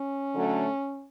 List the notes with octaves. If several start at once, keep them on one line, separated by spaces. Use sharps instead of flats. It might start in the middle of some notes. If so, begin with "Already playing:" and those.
Already playing: C#4
D3 F#3 A3